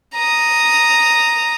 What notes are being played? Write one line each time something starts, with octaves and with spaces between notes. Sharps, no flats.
A#5 D#6